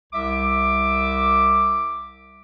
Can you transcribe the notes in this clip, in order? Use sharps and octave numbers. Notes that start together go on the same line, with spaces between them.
C2 E5 D6